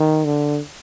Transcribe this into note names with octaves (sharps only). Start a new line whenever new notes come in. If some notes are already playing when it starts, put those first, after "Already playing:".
Already playing: D#3
D3